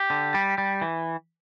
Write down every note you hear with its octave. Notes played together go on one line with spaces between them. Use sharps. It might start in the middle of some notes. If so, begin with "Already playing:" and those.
Already playing: G4
D3
G3
G3
E3